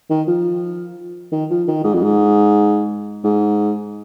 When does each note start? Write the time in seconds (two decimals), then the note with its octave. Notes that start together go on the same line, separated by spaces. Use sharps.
0.10 D#3
0.28 F3
1.32 D#3
1.50 F3
1.68 D#3
1.84 G#2
1.94 F2
2.03 G#2
3.24 G#2